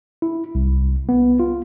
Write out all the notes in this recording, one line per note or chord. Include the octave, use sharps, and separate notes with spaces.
E4
C2
B3
F4